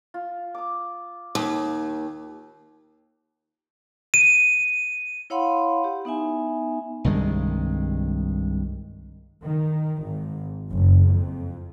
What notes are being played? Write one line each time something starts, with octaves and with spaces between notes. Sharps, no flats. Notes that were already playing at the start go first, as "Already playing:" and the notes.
F4
D6 D#6
D#2
D#7
E4 C#5 F5 F#5 B5 C6
G4
B3 D#4 E5 G#5
C2 G2 D#3 G#3
D#3
G#1
F#1
F2